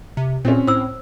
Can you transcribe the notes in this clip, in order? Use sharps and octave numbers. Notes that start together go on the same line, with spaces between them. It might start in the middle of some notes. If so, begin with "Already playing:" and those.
C3
A#2 C4 C#4
A2 C5 E6